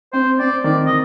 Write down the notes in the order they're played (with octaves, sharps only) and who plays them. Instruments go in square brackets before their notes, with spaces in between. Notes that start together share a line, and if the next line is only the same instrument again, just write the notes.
[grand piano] C4 [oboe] C5
[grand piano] C4 [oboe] D5
[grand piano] D#3 [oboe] D5
[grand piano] D#3 [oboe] D#5